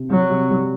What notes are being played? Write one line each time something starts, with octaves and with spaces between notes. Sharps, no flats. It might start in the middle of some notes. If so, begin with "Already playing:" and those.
Already playing: C3
F#3 G3
C3
G3